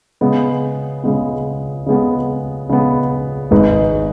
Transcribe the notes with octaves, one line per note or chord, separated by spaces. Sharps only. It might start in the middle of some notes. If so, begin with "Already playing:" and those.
C#3 G#3 B3
C#3 G#3 B3
C#3 G#3 B3
C#3 G#3 B3
G#1 G#2 G#3 D#4 B4